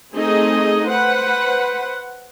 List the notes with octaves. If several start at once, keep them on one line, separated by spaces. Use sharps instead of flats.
A3 C4 D#4 G#4 D#5
B4 C5 F#5